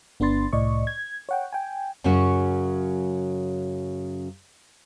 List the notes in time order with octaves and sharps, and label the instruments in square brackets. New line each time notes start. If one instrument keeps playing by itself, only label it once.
[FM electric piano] G1 B3 D4 B4 C6 A6
C2 A2 D5 D#5 C#6
G#6
C#5 F#5 G5
G5 G#5
[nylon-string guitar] F#2 C#3 F#3 C#4 F#4